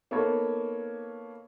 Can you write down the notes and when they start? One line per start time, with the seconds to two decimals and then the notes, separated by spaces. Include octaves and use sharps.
0.11 A#3 B3 D#4 A4 A#4 C#5